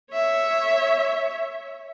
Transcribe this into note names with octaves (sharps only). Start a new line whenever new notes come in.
C#5 E5